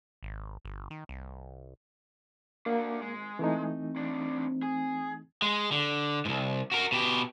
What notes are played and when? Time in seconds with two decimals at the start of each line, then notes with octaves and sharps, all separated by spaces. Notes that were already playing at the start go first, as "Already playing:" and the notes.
0.23 G#1
0.65 G1
0.90 D#3
1.09 C2
2.66 A#3 D4 F#4
3.01 G#1 G#3
3.39 E3 A3 C4 D#4
3.96 C2 D4
4.63 G#4
5.42 G#3
5.72 D3
6.25 C2 G#2
6.72 F#4 A#4
6.92 B2 G4